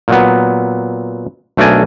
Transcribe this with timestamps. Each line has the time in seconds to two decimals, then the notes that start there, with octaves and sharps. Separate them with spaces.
0.08 A#2 F#3 B3
1.57 B1 A3 D4 A#4 D5 G#5